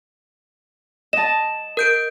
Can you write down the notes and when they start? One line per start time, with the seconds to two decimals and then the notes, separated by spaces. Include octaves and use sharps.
1.13 D#5 A5 E7
1.77 A#4 G6 D7